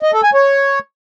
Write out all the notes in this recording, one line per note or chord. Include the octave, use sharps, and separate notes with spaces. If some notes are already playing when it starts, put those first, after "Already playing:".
D#5
A4
G#5
C#5